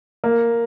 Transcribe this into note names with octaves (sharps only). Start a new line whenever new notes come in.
A#3